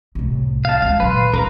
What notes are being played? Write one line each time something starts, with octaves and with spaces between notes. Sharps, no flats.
C2 A2
F5 A5
F#3 G#3 F5
F#2 A#2 B4 C6
F2 A#4 B4 A#5